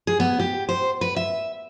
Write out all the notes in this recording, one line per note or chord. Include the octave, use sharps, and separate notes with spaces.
G#4
B3
G4
C5
B4
E5